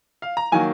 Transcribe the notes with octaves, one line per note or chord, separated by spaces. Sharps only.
F5
A#5
D#3 F#3 A#3 G#5